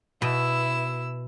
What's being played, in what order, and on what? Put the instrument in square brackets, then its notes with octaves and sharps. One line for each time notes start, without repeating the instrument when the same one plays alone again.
[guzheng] B2 [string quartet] E4 E6